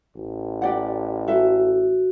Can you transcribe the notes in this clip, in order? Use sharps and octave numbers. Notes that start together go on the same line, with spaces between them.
A1
G4 D5 F#5
F#4 A4 E5